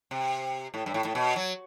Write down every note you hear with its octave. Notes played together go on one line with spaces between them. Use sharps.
C3
A2
G2
A2
A2
B2
F#3